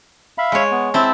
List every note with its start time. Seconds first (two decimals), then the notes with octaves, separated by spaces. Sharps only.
0.38 E5 F5 B5
0.52 G#3 C#5
0.71 B3
0.94 C4 E4 A5